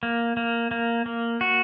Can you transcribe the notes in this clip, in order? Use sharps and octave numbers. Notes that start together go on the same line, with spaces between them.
A#3
A#3
A#3
A#3
F#4